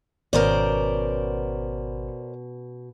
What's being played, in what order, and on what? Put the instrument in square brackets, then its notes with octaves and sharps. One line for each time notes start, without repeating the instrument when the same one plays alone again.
[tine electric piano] G#1 [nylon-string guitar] B2 B3 C#4 [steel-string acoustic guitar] A#4 C5 D5